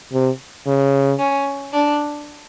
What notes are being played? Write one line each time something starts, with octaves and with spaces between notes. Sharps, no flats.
C3
C#3
C#4
D4